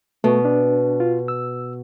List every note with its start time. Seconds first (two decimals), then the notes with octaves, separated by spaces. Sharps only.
0.24 B2 A3
0.45 D4
1.00 F4
1.28 E6